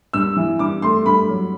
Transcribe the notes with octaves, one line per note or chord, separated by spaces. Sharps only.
G2 E6
E3
G2 D6
A3 C6
G2 B5
F#3